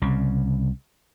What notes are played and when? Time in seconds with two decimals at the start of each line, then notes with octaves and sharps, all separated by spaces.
0.02 C2 C#3